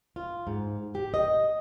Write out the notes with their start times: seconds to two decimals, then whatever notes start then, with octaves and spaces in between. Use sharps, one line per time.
0.16 F4
0.47 G#2
0.95 G4
1.14 D#5